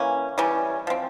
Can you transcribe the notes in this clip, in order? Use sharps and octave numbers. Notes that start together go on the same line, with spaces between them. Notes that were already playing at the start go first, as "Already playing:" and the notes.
Already playing: E3 A#3 C#4
E3 G3 C#4
F3 C4